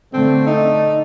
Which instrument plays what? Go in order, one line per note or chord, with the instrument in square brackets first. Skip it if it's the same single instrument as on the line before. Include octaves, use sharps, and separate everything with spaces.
[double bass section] D3 A3 [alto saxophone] C4
[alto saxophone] D#4